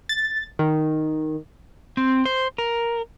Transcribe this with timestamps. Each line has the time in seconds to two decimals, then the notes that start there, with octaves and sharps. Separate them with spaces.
0.09 A6
0.59 D#3
1.97 C4
2.26 C5
2.58 A#4